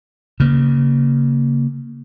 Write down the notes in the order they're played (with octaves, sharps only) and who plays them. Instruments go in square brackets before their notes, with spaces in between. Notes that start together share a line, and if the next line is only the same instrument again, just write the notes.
[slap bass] C#3 A#3